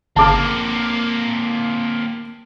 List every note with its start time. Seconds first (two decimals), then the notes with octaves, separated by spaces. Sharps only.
0.16 G1 C#3 A#3 C4 A5 D6 F6